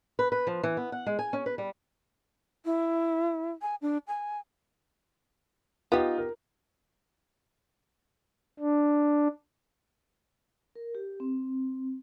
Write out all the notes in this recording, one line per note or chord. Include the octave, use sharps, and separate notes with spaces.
B4
B4
F3
E3
B3
F#5
G#3
G#5
C#4
B4
G3
E4
G#5
D4
G#5
B3 D#4 F4 G4
A#4
D4
A#4
G4
C4